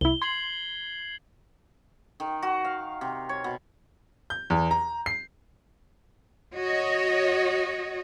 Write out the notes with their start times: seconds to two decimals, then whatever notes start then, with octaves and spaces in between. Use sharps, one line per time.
0.01 C2 E4 G7
0.22 C6 G#6 C7 F#7
2.20 D#3
2.42 F#4
2.65 F5
3.01 C3
3.29 C#5
3.44 B2
4.30 G6
4.50 E2
4.71 A#5
5.06 C7
6.55 F#4 C#5 D#5